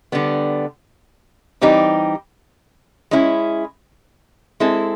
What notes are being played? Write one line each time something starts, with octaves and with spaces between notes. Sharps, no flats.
D3 G3 B3
E3 G3 C4 D#4 G4
G#3 C#4 E4
G#3 C4 E4 A4